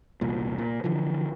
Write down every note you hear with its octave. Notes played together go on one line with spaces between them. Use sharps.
E1 C2 A#2
A#2
D3 E3 F3